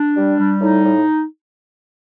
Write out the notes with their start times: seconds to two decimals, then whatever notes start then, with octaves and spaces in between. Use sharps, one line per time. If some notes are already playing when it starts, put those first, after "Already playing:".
Already playing: D4
0.16 G3
0.38 G3
0.61 A2 D#4
0.83 A2